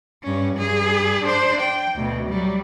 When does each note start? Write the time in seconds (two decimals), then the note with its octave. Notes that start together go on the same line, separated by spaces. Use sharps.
0.23 G2 C#4
0.56 G2 G#4
1.23 D4 C5
1.61 G5
1.95 D2 B2
2.29 F#3 G3